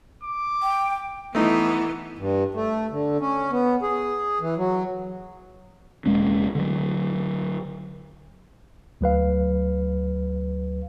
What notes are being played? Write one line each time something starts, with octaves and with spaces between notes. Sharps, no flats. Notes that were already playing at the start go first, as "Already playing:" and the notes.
D6
G5
E3 A3 B3 D#4
G2
A3
D3
C#4
B3
G#4
E3
F#3
E1 G#3 A#3 C#4
D3 F#3
D2 F#3 B4 F5